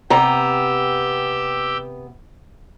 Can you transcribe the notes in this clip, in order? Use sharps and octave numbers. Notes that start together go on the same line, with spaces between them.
C3 B3 G4 A#5 E6 G6